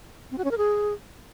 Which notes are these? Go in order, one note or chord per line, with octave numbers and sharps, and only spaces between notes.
C4
F#4
C#4
A#4
G#4